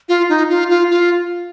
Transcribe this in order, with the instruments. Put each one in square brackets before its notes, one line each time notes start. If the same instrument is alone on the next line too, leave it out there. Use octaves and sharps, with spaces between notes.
[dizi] F4
D#4
F4
F4
F4